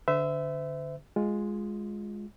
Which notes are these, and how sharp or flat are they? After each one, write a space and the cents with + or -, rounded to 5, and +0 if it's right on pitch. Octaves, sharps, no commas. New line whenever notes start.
D3 +0 C5 -40 E5 +0
G#3 +0 F4 +10